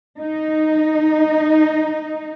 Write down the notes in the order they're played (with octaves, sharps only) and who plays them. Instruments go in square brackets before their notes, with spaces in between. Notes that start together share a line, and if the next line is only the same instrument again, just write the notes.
[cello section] D#4